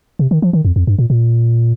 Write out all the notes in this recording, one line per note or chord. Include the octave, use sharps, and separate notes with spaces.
C3
D#3
F3
D#3
F2
F2
G2
A#2
A#2